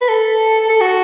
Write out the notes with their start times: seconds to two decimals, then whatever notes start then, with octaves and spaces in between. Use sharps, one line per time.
0.01 B4
0.09 A4
0.69 A4
0.81 F#4